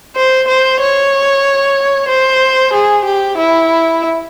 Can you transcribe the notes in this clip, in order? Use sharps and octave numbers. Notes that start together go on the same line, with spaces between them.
C5
C5
C#5
C5
G#4
G4
E4